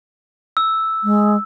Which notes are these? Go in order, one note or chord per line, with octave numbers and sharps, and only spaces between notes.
E6
G#3